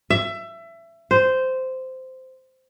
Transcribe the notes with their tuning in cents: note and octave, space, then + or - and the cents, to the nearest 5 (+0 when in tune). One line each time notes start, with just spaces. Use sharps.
E5 +25
C5 -10